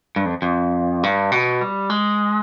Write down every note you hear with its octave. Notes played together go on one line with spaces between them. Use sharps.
G2
F2
F2
G2
B2
G3
G#3